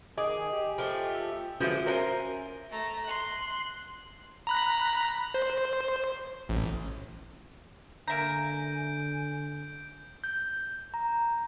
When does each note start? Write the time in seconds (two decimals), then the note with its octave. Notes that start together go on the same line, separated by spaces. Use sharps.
0.18 D#3 G#4 D#5 G#5 D6
0.53 G4
0.78 F3 A3
1.14 E6
1.60 D3 E3 F3 G#3 C#4 F#4 E5
1.86 A#4 C5 F#5 G#5
2.71 A3 A#5
3.05 C6 F#6
4.47 A#5 B5 F#6
5.34 C5
6.49 A1
8.08 D3 A#3 E5 G#5 A#5 G6 D7
10.24 G6
10.94 A#5